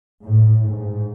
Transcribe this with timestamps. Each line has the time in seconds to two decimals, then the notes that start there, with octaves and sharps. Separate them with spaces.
0.25 A2
0.67 G#2